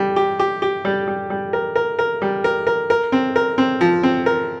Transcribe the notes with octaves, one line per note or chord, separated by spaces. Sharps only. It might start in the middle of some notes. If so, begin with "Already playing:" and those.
Already playing: G3
G4
G4
G4
G3
G3
G3
A#4
A#4
A#4
G3
A#4
A#4
A#4
C4
A#4
C4
F3
C4
A#4